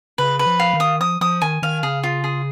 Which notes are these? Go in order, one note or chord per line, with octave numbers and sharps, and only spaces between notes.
C#3 B4
B4
F3
F5
D#3
D#6
F3 D#6
F3 D#6
D#3 G#5
D#3 F5
C#3 G#4
F4
G#4